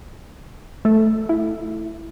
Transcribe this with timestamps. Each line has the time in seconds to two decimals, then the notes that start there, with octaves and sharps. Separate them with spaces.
0.85 A3 A4
1.29 E4